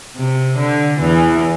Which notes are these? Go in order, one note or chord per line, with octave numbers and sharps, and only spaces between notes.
C3
D3
E2 E3